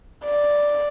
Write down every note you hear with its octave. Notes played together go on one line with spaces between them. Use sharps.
D5